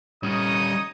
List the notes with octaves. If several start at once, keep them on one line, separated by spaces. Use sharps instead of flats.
G3 C#4 D#4 C#5 D#6